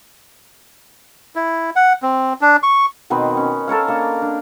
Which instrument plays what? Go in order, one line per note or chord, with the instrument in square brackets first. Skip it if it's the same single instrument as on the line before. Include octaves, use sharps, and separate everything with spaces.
[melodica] E4
F#5
C4
D4
C#6
[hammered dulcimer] B2 D#3 C4 B4
C#4
A4 A#4 C#5 F5
A#3 D4 F5
D4